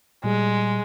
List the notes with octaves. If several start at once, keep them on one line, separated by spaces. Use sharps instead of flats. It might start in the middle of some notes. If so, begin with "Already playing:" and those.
A#2 G3 G#3 G#4